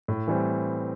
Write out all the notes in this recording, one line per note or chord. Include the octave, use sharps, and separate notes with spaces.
A2
E3 G3 C4